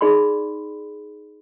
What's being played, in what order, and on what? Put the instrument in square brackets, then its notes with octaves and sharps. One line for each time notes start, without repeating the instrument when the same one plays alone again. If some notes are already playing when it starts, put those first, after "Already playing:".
[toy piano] D#4 G#4 D5 B5 C6